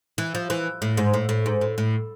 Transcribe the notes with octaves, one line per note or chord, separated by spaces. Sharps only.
E3
F3
E3
A2
G#2
A2
A2
G#2
A2
A2